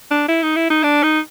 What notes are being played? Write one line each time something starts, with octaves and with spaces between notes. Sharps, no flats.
D4
E4
D#4
E4
D#4
D4
D#4